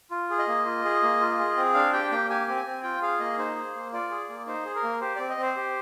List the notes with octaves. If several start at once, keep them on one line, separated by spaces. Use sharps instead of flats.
F4
G#4
D#5
A#3
F4
G#4
A#3
F4
G#4
C4
D4 F5
G4 G5
A#3 G5
G4 G#5
C4
G#5
C4
F4 G5
G#4 F5
A#3 D#5
D#4 C5
G#4
A#3
F4 D5
G#4
A#3
D#4 C5
G#4
A#4
A#3
G4 C5
C4 D5
D#5
C4 C5
G4